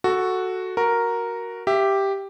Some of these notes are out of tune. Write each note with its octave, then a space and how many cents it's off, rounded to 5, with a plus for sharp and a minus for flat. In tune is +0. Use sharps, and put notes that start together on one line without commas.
F#4 +0 A4 +0
F#4 +0 A#4 +0
G4 +0 E5 +15